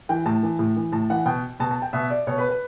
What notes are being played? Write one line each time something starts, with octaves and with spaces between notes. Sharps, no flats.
E3 G5
A2 A5
E3
A2
E3
A2 A5
E3 F#5
B2 G5
B2 A5
A5
G5
B2 E5
D5
B2 C#5
B4
B4